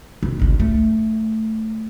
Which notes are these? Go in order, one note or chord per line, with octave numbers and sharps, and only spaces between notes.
E1
G#1 C#2
A3